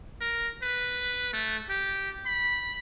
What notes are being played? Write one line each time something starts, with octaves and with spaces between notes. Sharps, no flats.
A#4
B4
A3
G4
B5